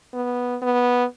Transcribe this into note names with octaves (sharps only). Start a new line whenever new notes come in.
B3
B3